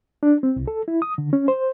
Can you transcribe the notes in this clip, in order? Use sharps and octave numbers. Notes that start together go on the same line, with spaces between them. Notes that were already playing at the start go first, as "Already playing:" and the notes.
D4
C4
C2
A4
E4
D#6
D3
C#4
C5